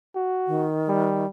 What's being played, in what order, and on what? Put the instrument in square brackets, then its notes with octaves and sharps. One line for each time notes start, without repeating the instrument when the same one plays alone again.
[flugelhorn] F#4
[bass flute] D#3
[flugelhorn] G3